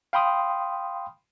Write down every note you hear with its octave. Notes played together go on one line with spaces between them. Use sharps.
F5 G5 B5 C6 D#6